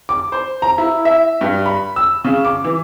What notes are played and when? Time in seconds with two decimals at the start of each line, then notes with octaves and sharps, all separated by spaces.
0.09 D6
0.32 C5
0.62 A#5
0.78 E4
1.05 E5
1.41 G2
1.66 B5
1.96 E6
2.24 C#3
2.45 D6
2.64 E3